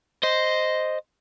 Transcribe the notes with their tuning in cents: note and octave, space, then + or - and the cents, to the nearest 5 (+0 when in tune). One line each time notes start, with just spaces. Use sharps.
C5 -5 D#5 +0